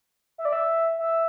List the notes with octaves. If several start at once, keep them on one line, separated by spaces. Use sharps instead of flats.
E5
D5
E5
E5